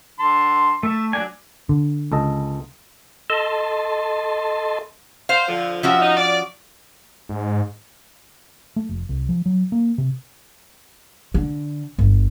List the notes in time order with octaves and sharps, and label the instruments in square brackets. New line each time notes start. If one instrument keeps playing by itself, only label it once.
[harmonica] D3 A5 C6
[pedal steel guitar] A3 [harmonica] E5 A5
[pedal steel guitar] F#3 G#5 [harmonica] D4
[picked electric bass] D3
[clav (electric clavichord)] C#2 A4 D#5
[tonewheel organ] A4 D#5 A5 C6
[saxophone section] C5 [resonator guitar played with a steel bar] F5
[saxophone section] D3 F3
[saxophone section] C3 E5 [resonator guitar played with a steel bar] F3 C#4 F#4
[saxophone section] D#4
D5
[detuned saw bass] G#2
[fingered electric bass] A3
F1
C2
F3
F#3
A#3
C3
[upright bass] D3
G1